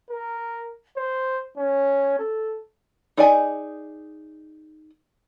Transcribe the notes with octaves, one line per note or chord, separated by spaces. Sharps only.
A#4
C5
C#4
A4
D#4 G#4 D5 D#5 G#5